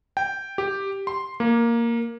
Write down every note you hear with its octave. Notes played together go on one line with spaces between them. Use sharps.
G5
G4
C6
A#3